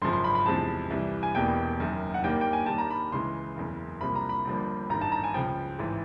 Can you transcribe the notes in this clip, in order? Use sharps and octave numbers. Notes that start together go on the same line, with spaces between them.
G#1 F#2 C#3 F3 C6
C6
B5
B5
E2 C3 F3 G#3 A5
C2 C3 E3 G3
G#5
E1 E2 B2 G3 A#3 G5
F#1 F#2 D#3
F#5
D#2 D#3 G3 A#3 G5
G5
G#5
D#2 D#3 G3 A5
A#5
B5
C#2 C#3 E3 G#3 C6
F#1 E2 C#3
C2 C3 F3 A#3 B5
A#5
B5
G1 G2 D3 F3 A#3
A1 G2 D#3 A#5
A5
A#5
G#5
C#2 C#3 F3 G5
A1 G#2 E3